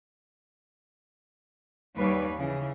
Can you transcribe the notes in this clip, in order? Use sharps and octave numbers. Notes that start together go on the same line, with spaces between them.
D#2 G3 B4 C#5
C#3 E3